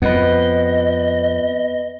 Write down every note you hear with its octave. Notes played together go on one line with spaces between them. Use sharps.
F2 B3 B4 D#5